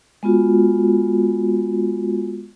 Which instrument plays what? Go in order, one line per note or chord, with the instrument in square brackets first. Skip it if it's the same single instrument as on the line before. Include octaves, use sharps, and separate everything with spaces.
[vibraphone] G#3 B3 F4 F#4